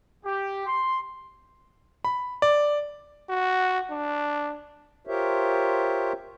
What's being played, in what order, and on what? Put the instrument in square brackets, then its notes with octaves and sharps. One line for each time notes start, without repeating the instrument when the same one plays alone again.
[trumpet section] G4
C6
[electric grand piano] B5
D5
[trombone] F#4
D4
[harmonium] F4 G4 A#4 C5 C#5 E5